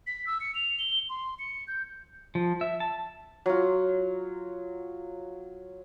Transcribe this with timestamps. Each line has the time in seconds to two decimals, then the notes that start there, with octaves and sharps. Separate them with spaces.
0.07 B6
0.27 E6
0.41 C#7
0.55 F7
0.79 G7
1.10 C6
1.39 C#7
1.68 G6
2.35 F3
2.61 E5
2.80 A5
3.46 F#3 F4